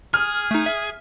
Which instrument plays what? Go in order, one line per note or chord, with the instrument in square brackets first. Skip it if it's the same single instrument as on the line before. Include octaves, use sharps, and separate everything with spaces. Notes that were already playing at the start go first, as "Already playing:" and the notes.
[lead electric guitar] G#4 [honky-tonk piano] F6
[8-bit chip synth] A3 D#4
E5